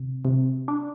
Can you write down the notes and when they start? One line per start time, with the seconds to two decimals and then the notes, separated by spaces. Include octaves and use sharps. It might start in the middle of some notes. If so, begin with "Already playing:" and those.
Already playing: C3
0.25 C3
0.68 D4